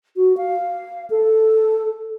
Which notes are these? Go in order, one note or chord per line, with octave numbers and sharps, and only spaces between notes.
F#4
F5
A4